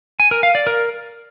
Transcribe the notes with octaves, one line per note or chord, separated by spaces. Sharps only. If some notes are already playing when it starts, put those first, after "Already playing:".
G#5
A#4
F5
D5
A#4